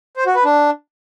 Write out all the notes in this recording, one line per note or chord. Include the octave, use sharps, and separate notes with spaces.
C5
F#4
B4
D4